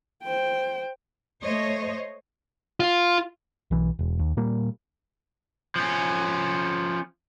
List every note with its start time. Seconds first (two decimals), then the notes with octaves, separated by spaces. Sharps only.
0.24 C5 G5
1.42 A3 C5 C#5 D#5
2.80 F4
3.71 B1 E3
3.99 E1
4.19 D#2
4.37 A#2 G3 A#3
5.76 F3 C#4